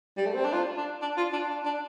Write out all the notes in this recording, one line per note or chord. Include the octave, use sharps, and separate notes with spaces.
G3
A3
C4
D4
F4
D4
D4
F4
D4
D4
D4